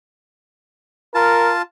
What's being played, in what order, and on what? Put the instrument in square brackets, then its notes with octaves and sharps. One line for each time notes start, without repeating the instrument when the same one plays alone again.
[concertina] F4 A5 [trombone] A#4